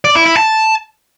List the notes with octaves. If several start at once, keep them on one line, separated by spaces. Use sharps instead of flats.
D5
E4
E4
A5